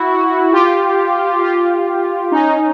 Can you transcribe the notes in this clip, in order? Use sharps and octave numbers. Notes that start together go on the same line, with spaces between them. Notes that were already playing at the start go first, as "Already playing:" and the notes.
Already playing: E4 F#4
F4 G4
F4 G4
C#4 D#4